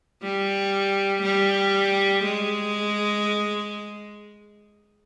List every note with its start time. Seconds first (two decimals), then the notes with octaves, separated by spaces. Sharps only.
0.23 G3
1.23 G3
2.24 G#3